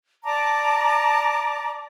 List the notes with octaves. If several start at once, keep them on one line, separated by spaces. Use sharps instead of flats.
D5 A5 A#5 D6